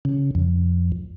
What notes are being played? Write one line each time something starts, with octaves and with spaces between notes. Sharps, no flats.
C#3
F2